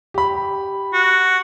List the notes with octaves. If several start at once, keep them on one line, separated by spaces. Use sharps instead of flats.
G4 B5
F#4